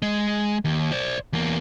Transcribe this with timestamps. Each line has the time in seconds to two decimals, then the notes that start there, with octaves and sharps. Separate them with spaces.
0.02 G#3
0.65 D#2
0.92 C5 D5
1.33 E2 A#3